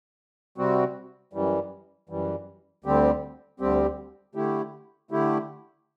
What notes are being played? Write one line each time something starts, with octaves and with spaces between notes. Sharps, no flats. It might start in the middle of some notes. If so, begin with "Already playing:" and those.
C3 G3 C4 F#4
F#2 E3 G3
F#2 E3 G3
D2 D3 G3 C4 G4
D2 D3 G3 C4 G4
D3 A3 E4 G4
D3 A3 E4 G4